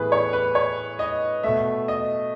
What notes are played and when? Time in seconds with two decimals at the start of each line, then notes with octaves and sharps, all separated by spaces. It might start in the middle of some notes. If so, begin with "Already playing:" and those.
Already playing: A2 E3 B3 G#4 B4
0.12 C#5
0.33 B4
0.55 C#5
0.99 D#5
1.43 B2 A3 E5
1.88 D#5